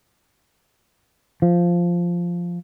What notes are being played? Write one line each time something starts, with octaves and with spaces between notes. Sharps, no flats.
F3